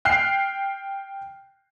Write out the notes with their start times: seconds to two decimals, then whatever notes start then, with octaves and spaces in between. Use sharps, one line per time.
0.05 G5 F6 F#6 C7